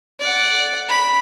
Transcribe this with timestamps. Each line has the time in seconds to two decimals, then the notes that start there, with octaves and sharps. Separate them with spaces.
0.20 D5 F#5
0.88 B5